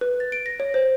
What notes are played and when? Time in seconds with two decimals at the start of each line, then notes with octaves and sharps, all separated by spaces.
0.01 B4
0.20 A6
0.32 D7
0.46 A#6
0.60 C#5
0.74 C5